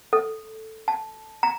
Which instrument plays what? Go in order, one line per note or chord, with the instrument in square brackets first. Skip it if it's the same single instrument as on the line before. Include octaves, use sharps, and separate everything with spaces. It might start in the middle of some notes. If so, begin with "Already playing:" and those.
[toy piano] A4
A5
A#5